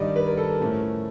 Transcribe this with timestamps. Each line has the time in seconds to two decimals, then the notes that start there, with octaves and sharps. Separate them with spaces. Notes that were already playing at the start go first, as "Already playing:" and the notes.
Already playing: G2 D#3 G3 D5 D#5
0.16 B4
0.27 A#4
0.37 A4
0.49 A#4
0.60 A2 F3 A3 C#4